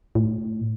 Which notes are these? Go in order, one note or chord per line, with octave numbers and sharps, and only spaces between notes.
A2